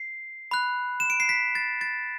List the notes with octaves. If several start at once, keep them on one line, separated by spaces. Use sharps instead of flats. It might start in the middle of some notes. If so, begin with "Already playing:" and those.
Already playing: C7
B5 F#6
E7
D7
C7
B6
A6
A6